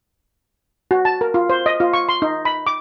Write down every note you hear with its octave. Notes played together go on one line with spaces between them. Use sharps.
F#4
A5
A#4
F4
C5
D#5
F4
C#6
C6
D#4
B5
D6